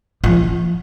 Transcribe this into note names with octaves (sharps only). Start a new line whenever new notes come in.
F3